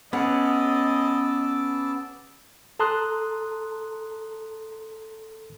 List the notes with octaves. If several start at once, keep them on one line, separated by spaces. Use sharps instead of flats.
B3 C#4 G#4 D#5 F#5 A5 D6 E6
A4 A5 A#5 C6 D#6 F#6